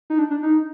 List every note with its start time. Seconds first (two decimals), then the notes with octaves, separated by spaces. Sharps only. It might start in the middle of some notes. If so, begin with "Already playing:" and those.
0.10 D#4
0.19 D4
0.31 D4
0.43 D#4